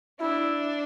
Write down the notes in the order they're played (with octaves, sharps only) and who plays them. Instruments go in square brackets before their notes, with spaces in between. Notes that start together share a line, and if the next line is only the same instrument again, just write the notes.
[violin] D4 [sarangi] E4